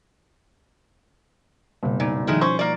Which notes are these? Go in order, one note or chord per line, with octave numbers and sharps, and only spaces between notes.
F#1 B2 G3
A#2 D#4 D5
D#3 F3 G#3 A3 D#4 E4
C#4 C5 C#6
A#3 D5